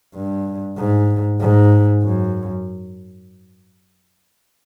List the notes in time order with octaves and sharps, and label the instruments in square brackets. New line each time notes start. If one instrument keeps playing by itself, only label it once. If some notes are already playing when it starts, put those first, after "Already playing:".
[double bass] G2
G#2
G#2
F#2